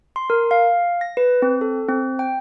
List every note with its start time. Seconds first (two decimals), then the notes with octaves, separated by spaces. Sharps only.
0.16 C6
0.30 A#4
0.51 F5
1.01 A#6
1.17 B4
1.42 C4
1.61 A4
1.89 C4
2.19 G5